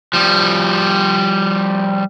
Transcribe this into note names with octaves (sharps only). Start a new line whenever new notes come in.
F3 G3